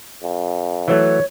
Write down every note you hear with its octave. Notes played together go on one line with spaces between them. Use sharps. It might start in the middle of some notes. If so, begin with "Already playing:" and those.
F2
E3 F#3 A3 C#5